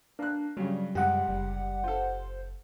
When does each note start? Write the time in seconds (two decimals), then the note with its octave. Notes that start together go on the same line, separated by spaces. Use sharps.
0.19 A#3 D4 F#6
0.57 G2 C#3 F#3 G3
0.95 C#2 F#2 C3 G4 F#5
1.28 F#1 G3
1.84 F4 A4 C5